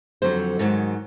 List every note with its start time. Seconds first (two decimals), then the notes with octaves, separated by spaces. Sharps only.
0.22 F2 D3 F#3 C5
0.59 G#2 D#3 F#3